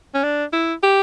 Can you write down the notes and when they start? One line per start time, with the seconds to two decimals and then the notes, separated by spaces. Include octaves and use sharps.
0.14 C#4
0.23 D4
0.53 E4
0.83 G4